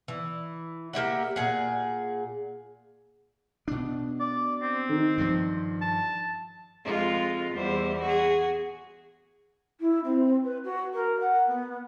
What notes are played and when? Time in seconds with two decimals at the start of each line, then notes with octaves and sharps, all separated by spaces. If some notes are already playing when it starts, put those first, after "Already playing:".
0.08 E3
0.93 A#3 G4 E5 F#5
1.36 A#2 G#4 F#5
3.68 B2 D4
4.20 D5
4.62 C4
4.89 D#3
5.18 G2 F3
5.81 A5
6.85 F2 G#3 F4
7.53 E2 G3 C5
8.02 F#4 G#4
9.80 E4
10.04 C4
10.44 B4
10.64 F#4
10.93 A#4
11.20 F#5
11.47 B3